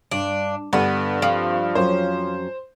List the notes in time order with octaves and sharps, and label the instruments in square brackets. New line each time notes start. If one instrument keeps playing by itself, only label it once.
[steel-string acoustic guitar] G2 [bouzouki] D4
[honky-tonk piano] G2 [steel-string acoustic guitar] D3 [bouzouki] B3
[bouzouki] F3 [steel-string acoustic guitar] C4
[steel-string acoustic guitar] F2 F#3 C#4 [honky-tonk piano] C5